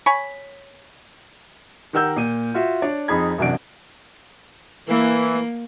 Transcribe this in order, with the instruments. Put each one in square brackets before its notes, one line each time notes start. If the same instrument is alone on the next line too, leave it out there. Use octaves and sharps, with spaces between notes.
[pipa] C#5 G#5 B5
[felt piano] D#3 G4 A#4 F#5 E6 G6
A#2 D#7
F4 F#4 E5
D4 C#5 D5
F2 D#4 G#4 B5 G#6
A1 F#2 C3 D4 F#5 D7
[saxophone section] E3 [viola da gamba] A#3